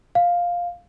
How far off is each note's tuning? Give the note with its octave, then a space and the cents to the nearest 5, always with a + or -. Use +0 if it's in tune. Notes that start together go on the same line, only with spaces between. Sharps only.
F5 +5